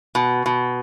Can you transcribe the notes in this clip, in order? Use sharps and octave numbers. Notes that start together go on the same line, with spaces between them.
B2
B2